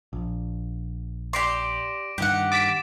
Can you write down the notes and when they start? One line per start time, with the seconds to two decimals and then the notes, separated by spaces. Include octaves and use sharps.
0.13 A#1
1.33 G4 D5 C6 D6 A#6 D7
2.18 G2 D#3 G4 F#5
2.52 D6 A6 B6 D7 E7